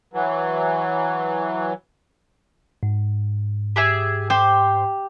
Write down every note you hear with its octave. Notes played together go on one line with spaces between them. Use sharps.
E3 F#3
G#2
G4 G#4 E5
G4 C5